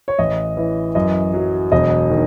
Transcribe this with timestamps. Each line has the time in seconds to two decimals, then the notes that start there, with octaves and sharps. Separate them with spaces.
0.08 C#5
0.19 A1 D#5
0.57 E3
0.95 F#2 D#5
1.34 F#3
1.72 E1 D#5
2.10 D#3